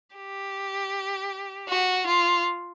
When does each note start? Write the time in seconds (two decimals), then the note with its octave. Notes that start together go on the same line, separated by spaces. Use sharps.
0.16 G4
1.69 F#4
2.07 F4